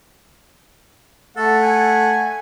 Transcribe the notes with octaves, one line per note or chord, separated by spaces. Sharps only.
A3 A4 F#5
G#5